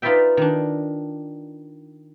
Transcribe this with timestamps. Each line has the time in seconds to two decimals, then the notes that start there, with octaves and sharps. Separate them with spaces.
0.02 D#4 F4 B4 D5 E5 G5
0.37 D#3 D4